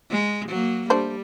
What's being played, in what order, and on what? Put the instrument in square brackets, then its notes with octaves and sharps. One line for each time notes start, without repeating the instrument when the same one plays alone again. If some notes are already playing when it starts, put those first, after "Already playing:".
[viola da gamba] G#3
F#3 A#3
[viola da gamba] G3 [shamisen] A3 D4 C5